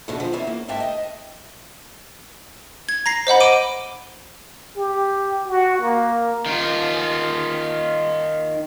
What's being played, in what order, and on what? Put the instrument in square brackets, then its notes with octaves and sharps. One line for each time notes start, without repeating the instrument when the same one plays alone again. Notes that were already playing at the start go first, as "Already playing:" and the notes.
[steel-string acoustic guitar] E2 B2 D3
F3 B3
A#2 E3 A#3 B3 C#4
A#3
G#2 D3 A#3 E5 G5 A5
D#5
[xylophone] G#6
A#5 A#6 C7
C5 D#5 F#5 B5
D6 D7 D#7 G7
[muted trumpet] G4
F#4
A#3
[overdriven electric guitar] D#3 F4